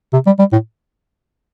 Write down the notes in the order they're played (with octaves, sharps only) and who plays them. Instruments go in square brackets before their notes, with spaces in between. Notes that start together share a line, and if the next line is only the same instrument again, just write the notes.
[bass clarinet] C3
G3
G3
A2